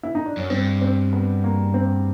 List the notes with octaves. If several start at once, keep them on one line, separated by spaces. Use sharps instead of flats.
E4
D#4
D4
F#2 C#4
G2 C4
C4
B3
A#3
C4